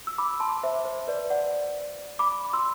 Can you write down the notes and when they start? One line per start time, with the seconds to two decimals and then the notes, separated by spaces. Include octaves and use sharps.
0.07 E6
0.18 B5 D6
0.40 A5 C6
0.63 C5 E5
0.85 C5
1.07 B4 D5
1.30 D5 F#5
2.19 B5 D6
2.53 C6 E6